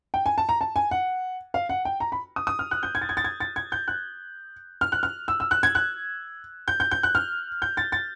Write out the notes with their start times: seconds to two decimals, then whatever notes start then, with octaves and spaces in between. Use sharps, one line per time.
0.14 G5
0.26 G#5
0.38 A5
0.49 A#5
0.61 A5
0.76 G#5
0.91 F#5
1.54 F5
1.69 F#5
1.85 G5
2.00 A#5
2.12 B5
2.36 D#6
2.47 D#6
2.59 F6
2.71 F#6
2.83 G6
2.95 G#6
3.01 A6
3.09 G#6
3.17 A6
3.24 G#6
3.40 A6
3.56 G#6
3.72 G6
3.88 F#6
4.81 F6
4.92 F#6
5.03 F6
5.28 E6
5.40 E6
5.51 F#6
5.63 G#6
5.75 F#6
6.68 G6
6.80 G6
6.91 G6
7.03 F#6
7.15 F6
7.62 G6
7.77 A6
7.92 A6